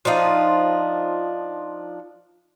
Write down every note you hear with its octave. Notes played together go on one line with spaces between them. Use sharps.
F3 D4 D#4 F4